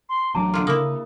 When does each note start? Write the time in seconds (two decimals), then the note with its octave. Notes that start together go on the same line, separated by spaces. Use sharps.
0.09 C6
0.35 A1 F#3 D4 A5 A#5 D6
0.54 D3 F4
0.67 C#3 A#3 E4 D#6